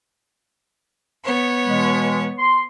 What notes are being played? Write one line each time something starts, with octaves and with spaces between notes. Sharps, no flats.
B3 C#5
B2 E3 G#3
C6